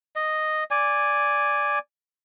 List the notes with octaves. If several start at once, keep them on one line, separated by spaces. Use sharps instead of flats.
D#5
D5 G#5